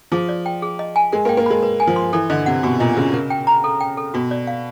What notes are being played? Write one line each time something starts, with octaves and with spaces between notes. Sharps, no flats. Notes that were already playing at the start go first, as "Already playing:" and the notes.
F3 G#4
D5
G5
G#4
D#5
G#5
G#3 A#4
A#3
G5
A#3
G#3 B5
B4
G#5
F3
C6
E3 A4
D3 D#5
C3 F#5
B2 F#4
A#2 D#5
C#3 F#4
A#4
G5
A#5
A4
G5
A4
B2 F#4
D5
F5